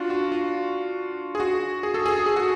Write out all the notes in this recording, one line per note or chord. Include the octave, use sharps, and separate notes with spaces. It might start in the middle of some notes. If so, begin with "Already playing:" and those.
Already playing: D4 F4 F#4
F#4
F4
G#4
F#4
G#4
A4
G#4
G#4
F#4